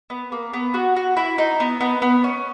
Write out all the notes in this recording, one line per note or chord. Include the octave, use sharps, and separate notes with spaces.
B3
A#3
B3
F#4
F#4
E4
D#4
B3
B3
B3
C#4